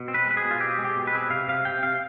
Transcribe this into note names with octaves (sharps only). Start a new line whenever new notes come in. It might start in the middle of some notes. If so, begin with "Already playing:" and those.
Already playing: B2
C4
B4
G#3
B4
G#4
B2
F4
C4 G4
G#3
G4
B2
B4
C4 G#4
B4
C3 F5
C3 F5
C3 G5
C3 F5